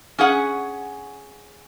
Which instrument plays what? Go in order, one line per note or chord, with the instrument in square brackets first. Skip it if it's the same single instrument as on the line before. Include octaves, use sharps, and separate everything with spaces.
[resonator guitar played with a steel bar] C#4 G#4 F#5